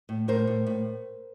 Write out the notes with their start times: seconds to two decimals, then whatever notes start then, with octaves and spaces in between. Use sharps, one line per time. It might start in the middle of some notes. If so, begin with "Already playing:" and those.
0.09 A2
0.28 A2 A#4 C5
0.47 A2
0.67 A2